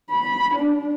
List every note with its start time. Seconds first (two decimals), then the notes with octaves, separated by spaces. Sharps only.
0.10 B5
0.54 D4